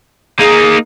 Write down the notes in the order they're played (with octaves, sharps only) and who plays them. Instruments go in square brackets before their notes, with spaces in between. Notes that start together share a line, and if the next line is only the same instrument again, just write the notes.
[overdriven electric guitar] A#3 D#4 [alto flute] G#4